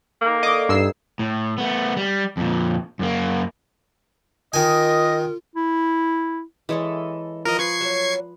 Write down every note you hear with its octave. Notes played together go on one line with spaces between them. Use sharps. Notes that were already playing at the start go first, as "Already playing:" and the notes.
A#3 D#4 A4 G5
D3 C#5 D#5 D6
G2 B3 D#4 E4 E6 C7
A2
A3 B3
G3
F2 A#2
F#2 A#3
D#3 F4 A#4 D#5 G#5
E4
E3 G#3 A4 C#5 D#5 E5
F3 A#4 D#5
B4 C#6 G#6 C7
F#3 A#3 C#4